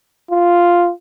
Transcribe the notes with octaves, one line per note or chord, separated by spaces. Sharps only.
F4